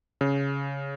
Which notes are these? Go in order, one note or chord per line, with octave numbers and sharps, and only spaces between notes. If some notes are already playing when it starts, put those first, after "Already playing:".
C#3